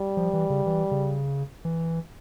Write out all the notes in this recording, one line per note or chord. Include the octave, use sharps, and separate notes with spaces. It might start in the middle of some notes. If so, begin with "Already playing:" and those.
Already playing: G3
F3
E3
C#3
E3
C#3
E3